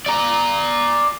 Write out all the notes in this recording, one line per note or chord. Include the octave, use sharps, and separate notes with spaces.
D5 A#5